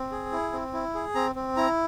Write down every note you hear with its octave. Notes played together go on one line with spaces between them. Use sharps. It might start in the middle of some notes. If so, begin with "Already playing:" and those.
Already playing: C4
G#4
E4
C4
E4
G#4
C4 A#5
C4
E4 A#5